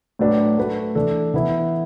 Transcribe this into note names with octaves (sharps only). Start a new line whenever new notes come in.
A2 F#3 D4 B4
A3 F#4 B4
E3 D4 A4
E3 B3 E4 B4